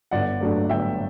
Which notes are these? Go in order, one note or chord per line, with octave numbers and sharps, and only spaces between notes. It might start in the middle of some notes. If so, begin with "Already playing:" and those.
G1 D5 F#5
G2 F#3 A3 D4
G1 E5 G5